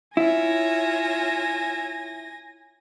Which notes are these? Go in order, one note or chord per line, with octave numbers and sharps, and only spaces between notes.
E4 F4 C#5 E5 G#5 A#6